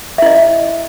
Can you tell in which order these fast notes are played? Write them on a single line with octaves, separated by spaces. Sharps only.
E5 E4 D#5